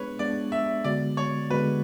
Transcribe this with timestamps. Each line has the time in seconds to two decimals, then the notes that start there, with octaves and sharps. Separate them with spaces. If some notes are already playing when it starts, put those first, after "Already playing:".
Already playing: G#3 B3 D4 G#4 B4 C#5
0.19 G#3 B3 D4 G#4 D5
0.52 E5
0.84 D3 G#3 B3 F#4 D5
1.17 C#5
1.50 D3 G#3 B3 F#4 B4